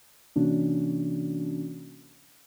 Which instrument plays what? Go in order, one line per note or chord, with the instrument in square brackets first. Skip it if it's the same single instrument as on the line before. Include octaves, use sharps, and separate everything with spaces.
[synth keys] C3 E3 A#3 C#4 D4 F#4